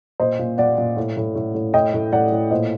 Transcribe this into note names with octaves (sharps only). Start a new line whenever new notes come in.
A#2 C5 D#5
A#2
A#2 D5 F#5
A#2
A2
A2
A2
A2
A2 D#5 G5
A2
A2 D5 F#5
A2
A#2 C5 D#5